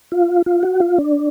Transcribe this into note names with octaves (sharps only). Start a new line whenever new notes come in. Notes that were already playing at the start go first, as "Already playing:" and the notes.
F4
F4
F#4
F4
D4